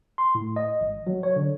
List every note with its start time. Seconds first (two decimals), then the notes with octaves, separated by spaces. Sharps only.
0.18 C6
0.35 A2
0.56 D#5
0.81 G#1
1.07 F#3
1.23 C#5
1.36 D3